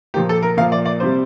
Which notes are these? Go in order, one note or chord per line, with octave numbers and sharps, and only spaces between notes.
A#2 F3 A#3 G4
A4
A#4
A#2 F3 A#3 F5
D5
D5
C3 G3 C5